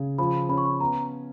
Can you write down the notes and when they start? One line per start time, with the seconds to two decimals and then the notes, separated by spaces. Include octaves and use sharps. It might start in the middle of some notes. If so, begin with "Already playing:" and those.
Already playing: C#3
0.18 F3 B5
0.49 C#4 B5
0.58 C#6
0.65 B5
0.80 B3 A#5